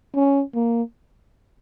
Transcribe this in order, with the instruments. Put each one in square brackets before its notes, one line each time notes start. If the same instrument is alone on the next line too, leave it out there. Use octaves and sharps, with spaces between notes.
[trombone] C#4
A#3